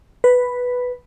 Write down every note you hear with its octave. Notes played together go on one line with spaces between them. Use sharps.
B4